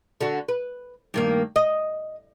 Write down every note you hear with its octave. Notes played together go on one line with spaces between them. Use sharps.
D3 F#4
B4
G2 D#3 A#3
D#5